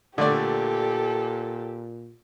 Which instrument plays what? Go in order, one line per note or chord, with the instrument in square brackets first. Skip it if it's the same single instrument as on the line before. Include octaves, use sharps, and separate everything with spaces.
[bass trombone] A#2 [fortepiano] D3 A3 D5 [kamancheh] G4 A4